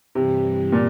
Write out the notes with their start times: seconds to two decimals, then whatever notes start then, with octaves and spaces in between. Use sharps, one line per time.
0.14 G2 C3 E3 G3
0.72 A#2